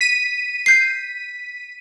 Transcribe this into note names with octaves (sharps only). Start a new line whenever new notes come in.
B6 D#7
G6 C7